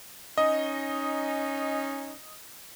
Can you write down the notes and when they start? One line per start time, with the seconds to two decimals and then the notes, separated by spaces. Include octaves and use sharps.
0.38 C#4 D#4 D#5